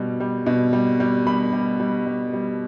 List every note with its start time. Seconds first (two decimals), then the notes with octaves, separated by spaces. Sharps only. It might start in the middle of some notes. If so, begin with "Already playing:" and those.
Already playing: B2 G3
0.20 G3
0.46 B2
0.73 G3
1.00 G3
1.27 G3 B5
1.53 G3
1.80 G3
2.06 G3
2.33 G3